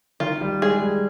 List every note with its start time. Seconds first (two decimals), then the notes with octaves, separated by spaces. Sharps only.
0.20 D#3 F4
0.41 G3
0.62 G#3 G#4
0.83 G3